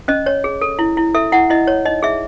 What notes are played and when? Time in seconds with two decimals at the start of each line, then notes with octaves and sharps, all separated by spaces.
0.08 C#4 D#5
0.26 C#5
0.44 G#4
0.61 A4
0.79 E4
0.97 E4
1.14 A4 E5
1.32 E4 F#5
1.50 E4 D#5
1.67 C#5
1.85 D#4 D#5
2.03 G#4 E5